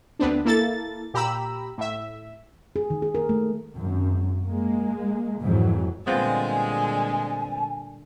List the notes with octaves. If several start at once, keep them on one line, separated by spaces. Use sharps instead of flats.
D2 B3 C4 D4
A#3 E4 A4 A6
A#2 G4 A#5 B5 E6
A2 E5
G#4
D#3
G#4
A#4
A3
G#1 F#2
G#3 A#3
F2 G#2 E3 F#3
A#2 D3 G3 G#3 B3 C4 F4 G#5